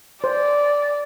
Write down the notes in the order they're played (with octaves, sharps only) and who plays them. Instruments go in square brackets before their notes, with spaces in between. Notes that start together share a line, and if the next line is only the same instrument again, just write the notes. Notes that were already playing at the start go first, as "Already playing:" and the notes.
[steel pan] C5 [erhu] D5